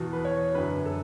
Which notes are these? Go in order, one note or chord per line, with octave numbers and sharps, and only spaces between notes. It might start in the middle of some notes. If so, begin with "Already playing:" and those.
Already playing: E2 B2
B4
C#5
F#2 D3 B4
A4